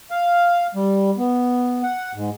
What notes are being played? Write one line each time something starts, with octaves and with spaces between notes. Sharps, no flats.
F5
G3
B3
F#5
G#2